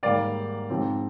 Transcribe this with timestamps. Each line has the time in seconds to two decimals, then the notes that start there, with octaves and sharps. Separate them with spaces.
0.03 G#2 D#3 G3 A#3 D5 F5
0.70 G#2 F3 C4